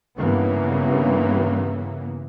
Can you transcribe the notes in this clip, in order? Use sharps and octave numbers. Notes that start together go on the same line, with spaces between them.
G2 C#3 E3 A#3 B3